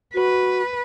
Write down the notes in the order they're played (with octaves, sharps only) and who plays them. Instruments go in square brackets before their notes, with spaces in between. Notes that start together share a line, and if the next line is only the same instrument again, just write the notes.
[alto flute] F#4 [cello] B4